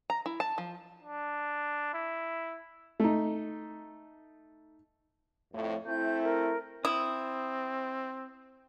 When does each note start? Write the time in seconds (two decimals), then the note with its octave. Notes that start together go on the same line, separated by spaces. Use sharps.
0.10 A#5
0.26 E4
0.40 A5
0.58 F3
1.03 D4
1.94 E4
3.00 A3 D#4
5.53 F2 A2
5.86 A3 C4 E4 G6
6.23 A#4
6.85 C4 E4 D#6